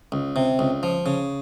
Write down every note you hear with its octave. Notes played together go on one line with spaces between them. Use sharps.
C#2
C3
C#2
F3
C#3